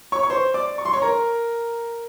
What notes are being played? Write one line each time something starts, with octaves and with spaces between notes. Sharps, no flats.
C#5 C#6
C#6
C5 C6
D5 D6
C#6
C6
C#5 C#6
A#4 A#5